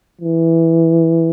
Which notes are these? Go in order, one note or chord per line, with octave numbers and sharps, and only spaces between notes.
E3